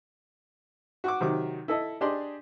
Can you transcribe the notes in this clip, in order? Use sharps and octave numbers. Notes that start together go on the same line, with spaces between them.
F#4 C#6 D6
C3 D#3 F#3 D6
E4 A4 D#5
D4 G4 G#4 D5 D#5 C6